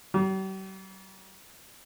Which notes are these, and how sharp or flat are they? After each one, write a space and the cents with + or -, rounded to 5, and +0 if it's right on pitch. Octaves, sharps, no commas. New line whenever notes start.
G3 -45